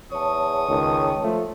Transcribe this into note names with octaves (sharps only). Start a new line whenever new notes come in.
E2 C#5 A5 C#6 D#6
C#2 D#3
F3 A3